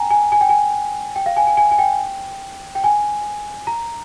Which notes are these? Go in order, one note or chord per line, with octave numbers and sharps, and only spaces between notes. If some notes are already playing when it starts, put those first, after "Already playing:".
Already playing: G5 G#5 A#5
G#5
G#5
G5
G#5
G5
F5
G#5
G#5
G#5
G#5
G5
G5
G#5
A#5